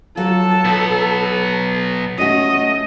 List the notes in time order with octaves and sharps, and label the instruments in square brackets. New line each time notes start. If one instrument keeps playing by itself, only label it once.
[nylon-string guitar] F#3 F4 [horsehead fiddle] A4 A5
[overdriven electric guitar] B1 B3
[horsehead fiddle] A3 D#5 [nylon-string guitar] C#4 F#4